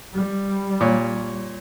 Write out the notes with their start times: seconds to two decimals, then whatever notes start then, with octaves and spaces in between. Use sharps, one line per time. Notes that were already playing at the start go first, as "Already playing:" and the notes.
0.14 G3
0.81 A#2 C#5